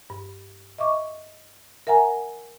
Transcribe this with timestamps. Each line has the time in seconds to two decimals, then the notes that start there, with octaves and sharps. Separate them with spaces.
0.10 G2
0.78 D#5 E5 C#6 D6
1.87 A#4 E5 F#5 G#5 A#5